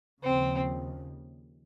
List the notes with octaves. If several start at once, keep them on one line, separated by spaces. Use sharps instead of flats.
D#2 C#3 F3 C4